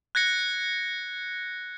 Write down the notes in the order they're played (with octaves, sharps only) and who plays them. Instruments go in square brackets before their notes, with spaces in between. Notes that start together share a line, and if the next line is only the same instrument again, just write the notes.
[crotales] F#6 G#6 A#6 C#7